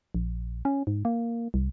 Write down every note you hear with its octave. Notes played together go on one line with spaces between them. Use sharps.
A#1
C#4
G#2
A#3
C2